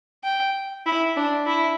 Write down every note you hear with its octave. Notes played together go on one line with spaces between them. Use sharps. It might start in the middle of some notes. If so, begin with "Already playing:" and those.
G5
E4
D4
E4